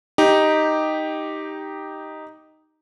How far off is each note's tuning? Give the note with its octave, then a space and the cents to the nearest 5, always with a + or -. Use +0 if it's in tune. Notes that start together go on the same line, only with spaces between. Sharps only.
D#4 +0 G4 +0